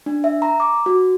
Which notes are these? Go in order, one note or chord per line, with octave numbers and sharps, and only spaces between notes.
D4
E5
A#5
D6
F#4